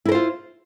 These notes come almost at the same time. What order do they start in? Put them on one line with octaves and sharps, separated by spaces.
E4 A#4 C5 F4